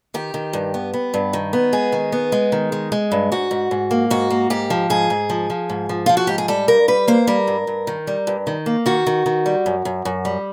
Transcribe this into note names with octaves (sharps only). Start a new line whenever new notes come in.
D#3 G4
D#3
G2
B3
B3
G2
D#3
B3
G#3 G#4
D#3
B3
G#3
D#3
G#3
G#3
G2
G#2 F#4
G#2
G#2
A#3
G#2 F#4
A#3
G#2 G4
F3
G#2 G#4
G#2
F3
F3
G#2
F3
F3 F4
F#4
G#2 G4
G#4
G3 A4
G2 A#4
G3 B4
A#3 C5
G3 A#4
G2
G2
D#3
G3
G2
D#3
A#3
D#3 F#4
D#3
D#3
G3
F#2
F#2
F#2
G3